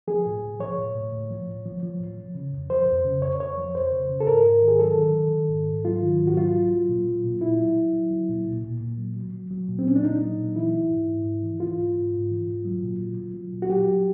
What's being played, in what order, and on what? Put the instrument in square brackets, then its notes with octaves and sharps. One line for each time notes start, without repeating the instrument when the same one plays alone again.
[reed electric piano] F3 G#4
A2
A2
F3 C#5
A2
A2
A2
F3
A2
F3
F3
A2
F3
C#3
F2
F3 C5
F2
C#3
F2 C#5
F2 C#5
F3
F2 C5
C#3
C#3
A4
G#2 A#4
G#2
D#3
G#4
F#3 A4
D#3
D#3
D#3
G#2
G#2
F#3 F4
D#3
G#2
F#4
F#3 F4
F#3
F#3
A#2
F#3
A#2
A#2 E4
F#3
F#3
F#3
F#3
A#2
A#2
A#2
A#2
F#3
F#3
F#3
F#3
A#2
C4
A#2 C#4
D4
A#2 D#4
F#3
A#2
E3 E4
E3
G#2
G#2
G#2
E3
E3 F4
G#2
G#2
G#2
E3
G#2
F#3
A#2
F#3
F#3
F#3
A#2
F#4
F#3 G4
F#3